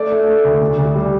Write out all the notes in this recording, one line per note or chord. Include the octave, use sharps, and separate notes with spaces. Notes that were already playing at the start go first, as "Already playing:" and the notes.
Already playing: A3 D5
A3
A3
D2
D2
D2
G3